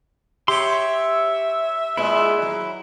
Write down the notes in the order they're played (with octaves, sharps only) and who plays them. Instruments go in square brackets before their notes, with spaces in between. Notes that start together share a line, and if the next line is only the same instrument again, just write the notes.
[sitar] G4 [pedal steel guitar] C#5 C6 [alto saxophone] E5
[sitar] A#2 G#3 B3 [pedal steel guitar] E4
[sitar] F#3